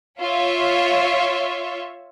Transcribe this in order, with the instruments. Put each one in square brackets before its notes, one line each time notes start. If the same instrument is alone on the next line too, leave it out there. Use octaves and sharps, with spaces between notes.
[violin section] F4 C#5 E5